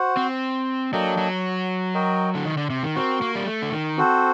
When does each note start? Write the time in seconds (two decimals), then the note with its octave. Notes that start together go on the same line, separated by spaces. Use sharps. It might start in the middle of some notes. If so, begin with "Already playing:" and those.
Already playing: F#4 C5 F#5
0.17 C4
0.93 F#3 A#3 D4 A4 D#5 G5
1.18 F#3
1.95 F#4 A#4 D#5 G5
2.35 D3
2.46 D#3
2.57 D3
2.70 C3
2.83 D#3
2.95 C4 F#4 A#4 F#5
3.22 A#3
3.36 G3
3.46 A3
3.62 D3
3.72 D#3
3.97 C4 F#4 A4 C5 F#5